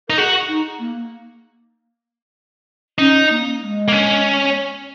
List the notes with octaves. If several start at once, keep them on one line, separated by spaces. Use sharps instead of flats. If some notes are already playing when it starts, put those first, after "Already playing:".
D#4 A#4
F#4 G#4
D#4
A#3
C#4 D#4
A#3
G#3
A#3
C#4